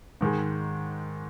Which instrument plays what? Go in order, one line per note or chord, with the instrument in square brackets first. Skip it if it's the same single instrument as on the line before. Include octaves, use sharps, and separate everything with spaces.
[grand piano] G#2 D#3 G#3